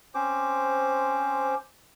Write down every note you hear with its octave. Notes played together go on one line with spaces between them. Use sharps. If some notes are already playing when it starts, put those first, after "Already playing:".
C4 C#4 C5 D6